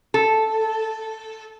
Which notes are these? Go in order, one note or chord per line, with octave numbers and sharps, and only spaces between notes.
A4